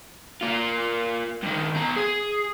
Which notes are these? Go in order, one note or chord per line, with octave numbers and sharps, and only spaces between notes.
A#3 F4
G2 D#3
B2 A#5
G#4